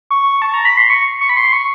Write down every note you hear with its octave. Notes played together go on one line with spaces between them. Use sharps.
C#6
A5
A#5
B5
C6
C#6
C#6
B5
C6
C#6